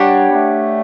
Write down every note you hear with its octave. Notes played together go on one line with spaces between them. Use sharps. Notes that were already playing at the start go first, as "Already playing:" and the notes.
Already playing: G3 D4 G4 C#5 F#5
B3
A3